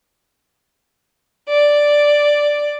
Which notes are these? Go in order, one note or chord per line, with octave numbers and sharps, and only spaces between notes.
D5